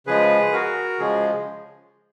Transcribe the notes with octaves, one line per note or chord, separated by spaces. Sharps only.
C#3 F3 G#3 G#4 B4
F#4 A#4
C#3 F3 G#3 G#4